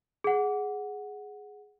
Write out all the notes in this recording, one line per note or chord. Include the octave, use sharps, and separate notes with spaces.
G#4 F#5